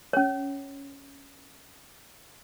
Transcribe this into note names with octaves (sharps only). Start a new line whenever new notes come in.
C#4 C#5